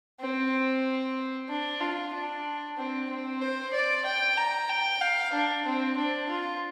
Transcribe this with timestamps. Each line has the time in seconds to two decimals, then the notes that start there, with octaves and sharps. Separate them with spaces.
0.20 C4
1.49 D4
1.80 F4
2.13 D4
2.77 C4
3.09 C4
3.41 C5
3.73 D5
4.05 G5
4.37 A#5
4.69 G5
5.01 F5
5.33 D4
5.66 C4
5.98 D4
6.29 F4